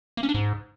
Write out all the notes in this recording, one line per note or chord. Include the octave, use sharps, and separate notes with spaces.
A#3
C#4
D4
G#2